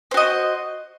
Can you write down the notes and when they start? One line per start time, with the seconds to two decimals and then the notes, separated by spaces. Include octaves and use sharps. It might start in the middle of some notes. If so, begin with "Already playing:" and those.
0.11 C5
0.14 F#4
0.17 D#5